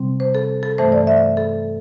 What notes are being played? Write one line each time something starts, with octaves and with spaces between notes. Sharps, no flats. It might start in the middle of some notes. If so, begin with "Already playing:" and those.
Already playing: C3 G3 C4
C5
A4
A4
G2 E3 A3 C5
D5
E5
A4